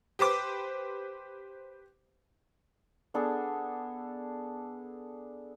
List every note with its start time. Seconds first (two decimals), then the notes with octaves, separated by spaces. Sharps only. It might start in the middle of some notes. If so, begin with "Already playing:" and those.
0.19 G4 B4 C5 D6
3.14 B3 D4 G#4 A4